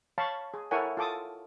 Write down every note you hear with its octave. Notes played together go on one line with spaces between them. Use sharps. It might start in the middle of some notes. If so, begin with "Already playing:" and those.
C#5 F5 A5 B5 C#6
G#4
E4 A4 A#4 C#5 F#5 G#5
F4 A4 D6 D#6